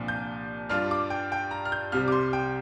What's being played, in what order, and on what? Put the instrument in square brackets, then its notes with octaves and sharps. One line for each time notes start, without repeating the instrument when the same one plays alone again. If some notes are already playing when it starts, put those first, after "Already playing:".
Already playing: [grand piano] C2 A#2 F3 D4
G6
G2 G3 D4 F4 F6
D6
G5
G5
A#5
F6
G6
C2 C3 G3 F6
D6
C6
G5